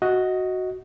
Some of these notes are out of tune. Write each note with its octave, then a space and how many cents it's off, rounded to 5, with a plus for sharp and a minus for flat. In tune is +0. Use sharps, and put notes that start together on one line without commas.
F#4 +0 D#5 +15